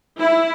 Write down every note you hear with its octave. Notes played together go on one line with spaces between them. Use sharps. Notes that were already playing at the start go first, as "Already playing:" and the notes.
E4